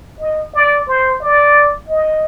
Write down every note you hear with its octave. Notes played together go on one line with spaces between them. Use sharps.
D#5
D5
C5
D5
D#5